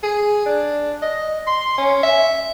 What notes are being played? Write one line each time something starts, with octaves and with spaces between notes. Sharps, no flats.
G#4
D4
D#5
C6
C#4
E5